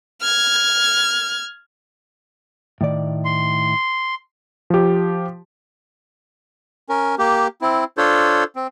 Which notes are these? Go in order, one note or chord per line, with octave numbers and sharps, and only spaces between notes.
F6 G#6
A2 D#3 D5
C6
F3 G4
C#4 A#4
A#3 G4
C4 E4
D4 F4 A4 C5 C#5
C4